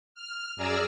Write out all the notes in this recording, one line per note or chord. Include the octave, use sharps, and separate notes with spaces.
F6
F#2 G#4 D5 A#5 E6 F6